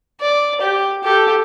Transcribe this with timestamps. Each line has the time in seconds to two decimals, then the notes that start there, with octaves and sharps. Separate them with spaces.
0.21 D5
0.61 G4
1.03 G4 A4